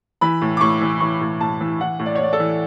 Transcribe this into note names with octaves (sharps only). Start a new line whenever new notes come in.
E3 B5
A2
D6
A2 C#6
E3
E3 C#6
A2
A2 A5
E3
E3 F#5
A2
D5
C#5
A2 D5
A4
E3